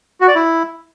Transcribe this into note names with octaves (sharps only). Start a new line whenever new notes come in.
F#4
D5
E4